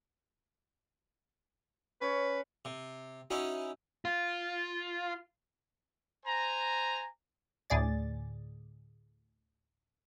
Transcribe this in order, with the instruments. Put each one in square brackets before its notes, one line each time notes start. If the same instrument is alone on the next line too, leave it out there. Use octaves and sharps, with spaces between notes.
[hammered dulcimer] C#4 C#5 [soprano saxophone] B4
[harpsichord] C3
[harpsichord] C#4 D#4 E4 [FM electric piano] F#4 E5
[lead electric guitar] F4
[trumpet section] C5 G#5 A#5
[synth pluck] D2 A2 G#4 D5 A6